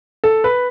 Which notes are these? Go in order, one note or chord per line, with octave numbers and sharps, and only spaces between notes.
A4
B4